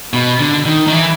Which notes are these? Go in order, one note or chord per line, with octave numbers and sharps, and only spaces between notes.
B2
D3
D#3
D#3
E3